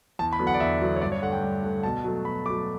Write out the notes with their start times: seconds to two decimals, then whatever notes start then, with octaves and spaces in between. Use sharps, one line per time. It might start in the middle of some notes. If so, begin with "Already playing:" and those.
0.19 E2 A5
0.33 B5
0.39 D3 F#3 B3
0.47 F#5
0.54 D5
0.60 E2 E5
0.81 D3 F#3 B3
0.96 C#5
1.02 G2 D5
1.12 C#5
1.22 D3 A3 F#5
1.32 G5
1.43 G2
1.63 D3 A3
1.83 B2 A5
2.04 F#3 A3
2.25 B2 B5
2.46 F#3 A3 D6